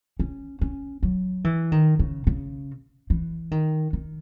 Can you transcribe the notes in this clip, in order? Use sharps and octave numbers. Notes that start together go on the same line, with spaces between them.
C#4
C#4
F#3
E3
D#3
C#3
C#3
E3
D#3
D#3